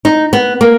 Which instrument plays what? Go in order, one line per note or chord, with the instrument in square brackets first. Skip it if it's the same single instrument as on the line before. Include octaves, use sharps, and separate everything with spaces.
[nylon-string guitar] D#4
B3
A#3